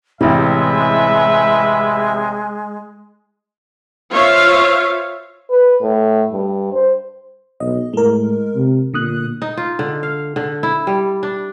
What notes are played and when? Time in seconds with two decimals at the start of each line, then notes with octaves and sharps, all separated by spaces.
0.21 A1 C3 G#3 E4 B4 E5
4.11 F4 C5 C#5 E5 F5
5.50 B4
5.82 A2
6.33 G2
6.73 C5
7.60 B1 D#5
7.94 A2 G#3 A#4
8.55 C3
8.94 A#2 D3 D#6 F#6
9.42 D#4
9.57 F4
9.79 D3
10.03 F5
10.36 D3
10.63 E4
10.87 G3
11.23 D4